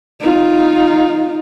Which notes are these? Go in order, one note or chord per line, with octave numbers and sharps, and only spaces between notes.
D#4 F4